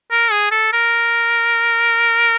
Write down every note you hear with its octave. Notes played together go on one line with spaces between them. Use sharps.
A#4
G#4
A4
A#4